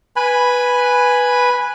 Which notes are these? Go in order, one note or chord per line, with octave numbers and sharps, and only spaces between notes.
B4 G#5 B5